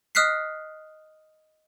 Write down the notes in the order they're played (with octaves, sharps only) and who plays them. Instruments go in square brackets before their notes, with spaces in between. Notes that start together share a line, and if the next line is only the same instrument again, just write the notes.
[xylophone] D#5 D#6 F6 F#6 B6 C7